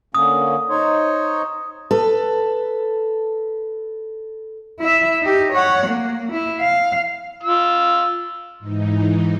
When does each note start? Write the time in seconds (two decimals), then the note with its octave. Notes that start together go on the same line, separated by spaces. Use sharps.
0.15 D3 A#3 C#4 D#6
0.70 D#4 C5 C#5
1.91 A4 B4
4.80 E4 E5
5.22 D#4 G4
5.52 C#5 F#5
5.87 A#3
6.32 E4
6.60 F5
7.43 F4 E6
8.59 G#2 E3 D#4